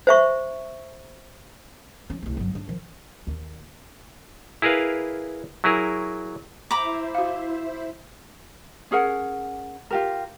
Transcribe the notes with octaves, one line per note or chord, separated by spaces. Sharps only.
C5 E5 C#6
F3 C#4
C2 A3
G1 F#3
G#2 D4
D#3 F3
D#2
E4 G#4 A#4 B4 F5
F#3 E4 G#4 A#4
E4 C5 E5 A#5 B5 D6
F#4 F5
C#4 G#4 A#4 F#5
F4 G4 A#4